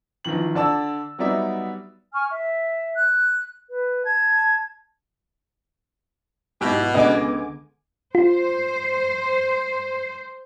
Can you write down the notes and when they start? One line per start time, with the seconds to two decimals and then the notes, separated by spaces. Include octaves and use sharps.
0.25 A#1 D#3 E3 F#7
0.55 D3 D5 A5 E6
1.19 F#3 G3 B3 D#4 D5 E5
2.12 G#5 C#6 F6
2.30 E5
2.95 F#6
3.68 B4
4.05 A5 G#6
6.61 B1 G#2 B2 E4 G4
6.94 C#2 D3 B3 D#5 G#5 D6
8.15 F4 C5